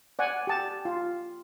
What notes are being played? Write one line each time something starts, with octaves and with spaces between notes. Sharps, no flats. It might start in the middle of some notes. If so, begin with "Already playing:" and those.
D5 F#5 G#5
G4 A5
F4